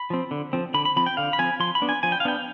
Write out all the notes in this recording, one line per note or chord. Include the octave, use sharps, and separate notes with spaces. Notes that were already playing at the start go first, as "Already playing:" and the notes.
Already playing: B5
F3 C4
D3
F3 C4
D3 B5
B5
F3 C4 B5
G5
D3 F5
B5
F3 C4 G#5
F3 C6
B5
B3 D4
G#5
F3 G#5
G5
F5
B3 D4 G5